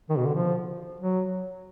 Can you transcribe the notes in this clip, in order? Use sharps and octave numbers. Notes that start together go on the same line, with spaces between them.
D#3
B2
D3
F3
F#3